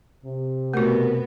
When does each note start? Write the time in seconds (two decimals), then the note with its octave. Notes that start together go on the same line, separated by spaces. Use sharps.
0.24 C3
0.74 B2 A3 B3 F#4 A#4